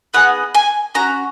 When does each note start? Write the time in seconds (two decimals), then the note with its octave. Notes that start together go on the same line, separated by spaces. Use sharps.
0.14 B3 D#4 G#4 F#5
0.55 G#5
0.95 C#4 F#4 A#5